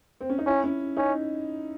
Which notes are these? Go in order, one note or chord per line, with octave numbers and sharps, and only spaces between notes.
C4
C#4
D#4
C#4 E4
C#4
C#4 D#4